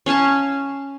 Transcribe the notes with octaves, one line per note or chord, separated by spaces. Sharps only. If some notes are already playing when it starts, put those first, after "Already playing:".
C#4 F5 G#5 A5